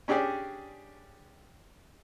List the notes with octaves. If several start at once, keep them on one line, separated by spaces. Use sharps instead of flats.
C#4 D4 G4 G#4 D5